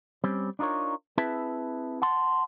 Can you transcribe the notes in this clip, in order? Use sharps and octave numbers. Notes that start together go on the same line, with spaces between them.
G3 C4 C#4
D4 D#4 F4 A#4 C#5
C4 E4 G#4 B4 E5 A5
F#5 A5 C6